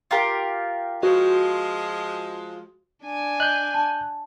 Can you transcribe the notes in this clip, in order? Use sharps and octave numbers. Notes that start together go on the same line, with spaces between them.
F4 G4 A#4
F3 G#3 F#4
D4 G#5
D#5 F#6 G6
A5